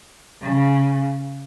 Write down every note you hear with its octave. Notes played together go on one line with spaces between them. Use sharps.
C#3